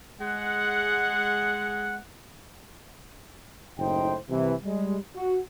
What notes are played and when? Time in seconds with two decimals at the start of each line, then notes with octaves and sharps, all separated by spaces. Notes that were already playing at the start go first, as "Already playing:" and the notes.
0.21 G#3 F#5
3.78 F#1 A2 D#4 C5 G5
4.29 C2 C3 E3
4.64 G3 G#3
5.15 F#4